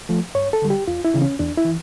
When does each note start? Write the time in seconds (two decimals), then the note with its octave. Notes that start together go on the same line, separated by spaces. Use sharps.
0.09 F3 A3
0.35 G2 C#5
0.53 A4
0.62 D3 G3
0.70 G4
0.87 E2 F4
1.05 E4
1.14 C#3 E3
1.22 C#4
1.39 E2 D4
1.57 E4
1.65 E3